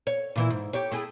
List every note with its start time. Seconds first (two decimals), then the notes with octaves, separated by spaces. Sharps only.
0.07 C#5
0.36 A#2 E3 E4
0.50 G#2
0.73 G4 C#5
0.92 A3 E4 G#4